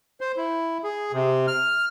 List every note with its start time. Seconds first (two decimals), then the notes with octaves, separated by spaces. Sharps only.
0.21 C5
0.37 E4
0.84 G#4
1.12 C3
1.47 F6